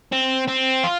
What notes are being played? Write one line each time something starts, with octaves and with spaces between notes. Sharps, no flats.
C4
C4
F4